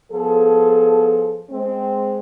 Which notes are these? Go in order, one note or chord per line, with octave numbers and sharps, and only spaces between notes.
F3 B3 G#4 A4
G#3 C4